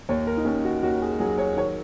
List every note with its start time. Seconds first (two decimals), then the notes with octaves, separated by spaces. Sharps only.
0.09 D#2 C#5
0.27 A#4
0.37 D#4
0.45 D#2 C#4
0.65 F#4
0.83 D#2 F#4
1.02 G#4
1.20 F#3 G#4
1.38 C#5
1.57 D#3 C#5